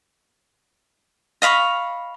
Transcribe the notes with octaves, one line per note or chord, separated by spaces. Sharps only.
D#5 F5 B5 C#6